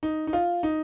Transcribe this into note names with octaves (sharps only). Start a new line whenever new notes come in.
D#4
D#4
F4
D#4